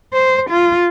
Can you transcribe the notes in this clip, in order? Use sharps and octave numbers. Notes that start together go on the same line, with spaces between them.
C5
F4